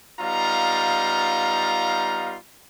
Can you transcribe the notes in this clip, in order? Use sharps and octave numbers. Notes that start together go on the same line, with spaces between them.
G3 B3 D#4 F4 F5 A#5